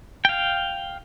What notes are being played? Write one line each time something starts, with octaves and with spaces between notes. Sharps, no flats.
F5 G5